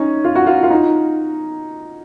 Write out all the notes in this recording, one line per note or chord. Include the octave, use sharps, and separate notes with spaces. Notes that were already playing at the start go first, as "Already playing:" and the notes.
Already playing: C#4 D#4
F4
F#4
F4
F4
D#4